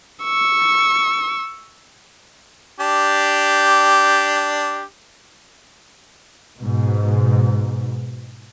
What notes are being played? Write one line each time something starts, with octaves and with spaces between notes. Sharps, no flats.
C#6 E6
D4 G4
G#2 B2